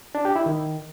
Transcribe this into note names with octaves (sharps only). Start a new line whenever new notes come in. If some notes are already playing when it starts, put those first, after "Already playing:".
D4
G4
E4
D#3